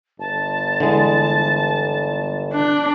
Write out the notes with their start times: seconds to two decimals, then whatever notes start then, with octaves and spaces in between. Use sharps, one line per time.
0.19 G1 A5
0.80 D3 E3 G#3
2.53 D4 F#6